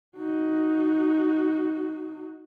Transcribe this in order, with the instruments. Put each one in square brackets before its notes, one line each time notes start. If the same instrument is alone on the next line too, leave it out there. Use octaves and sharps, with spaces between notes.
[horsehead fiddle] D#4 F#4